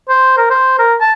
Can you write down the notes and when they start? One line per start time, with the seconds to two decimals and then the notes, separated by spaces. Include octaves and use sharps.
0.09 C5
0.38 A#4
0.50 C5
0.79 A#4
1.01 A5